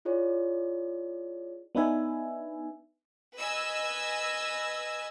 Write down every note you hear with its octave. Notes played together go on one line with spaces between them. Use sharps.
E4 F4 G#4 C#5 D5
B3 D4 D#4 B4 E5 G#5
B4 D#5 G#5 E6